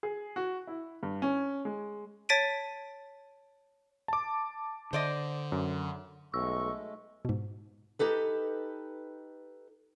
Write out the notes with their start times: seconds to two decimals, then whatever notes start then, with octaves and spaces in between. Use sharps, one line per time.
0.03 G#4
0.36 F#4
0.67 E4
1.03 G2
1.22 C#4
1.65 G#3
2.29 C#5 A5 A6 B6 D7 D#7
4.08 A5 D6
4.93 D3 C5 D5 D#5
5.52 F#2
6.34 B1 G#3 A3 C#6 E6
7.25 G#2 B2
7.99 D#4 G4 A4 B4